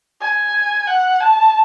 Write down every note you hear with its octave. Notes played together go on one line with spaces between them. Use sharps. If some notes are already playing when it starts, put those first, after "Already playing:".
G#5
F#5
A5